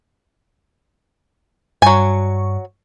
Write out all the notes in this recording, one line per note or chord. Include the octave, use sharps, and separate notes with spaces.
G2 F#3 G#5 C#6